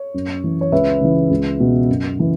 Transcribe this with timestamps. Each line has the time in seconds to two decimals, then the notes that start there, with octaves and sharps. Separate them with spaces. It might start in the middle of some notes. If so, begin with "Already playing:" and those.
Already playing: C#5
0.14 F#2
0.44 E3
0.61 C#5
0.72 C#2 B4 E5
1.01 C#3 E3
1.30 C#2
1.60 B2
1.89 F#2
2.18 C#3 E3